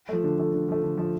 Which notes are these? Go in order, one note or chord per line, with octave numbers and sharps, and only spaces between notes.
F3 A3
D3
F3 A3
D3
F3 A3
D3
F3 A3